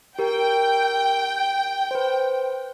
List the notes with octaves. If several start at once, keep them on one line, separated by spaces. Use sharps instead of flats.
G4 A#4 G5
B4 C5